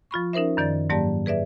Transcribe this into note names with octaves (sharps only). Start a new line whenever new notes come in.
F3 F4 B5 C#6
C#4 D#4 A#4 C5 E5
F#2 D#3 D5 A6
G#2 F#3 A#3 G4 D5 A5
G#4 B4 D5 E5